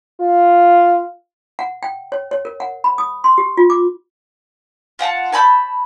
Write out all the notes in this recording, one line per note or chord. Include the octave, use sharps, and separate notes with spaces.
F4
F#5
G5
C#5
C#5
A#4
F#5
B5
D#6
C6
G4
F4
D6
F4 F#5 G5 A5
C#5 A5 B5 G6